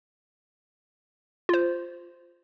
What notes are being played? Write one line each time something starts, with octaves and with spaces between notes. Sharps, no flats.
F4 C5